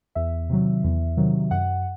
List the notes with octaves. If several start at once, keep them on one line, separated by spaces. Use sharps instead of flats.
E2 E5
C3 D#3 F#3
E2
C3 D#3 F#3
F#2 F#5